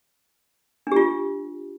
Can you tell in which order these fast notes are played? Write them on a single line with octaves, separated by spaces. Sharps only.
D4 G4 F4